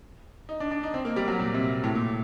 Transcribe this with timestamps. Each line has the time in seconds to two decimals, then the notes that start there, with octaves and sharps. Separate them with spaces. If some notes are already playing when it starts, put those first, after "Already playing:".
0.49 D#4
0.60 D4
0.71 D4
0.83 D#4
0.94 C4
1.05 A#3
1.16 G3
1.28 F#3
1.39 A#2
1.54 C3
1.84 A2
1.95 A#2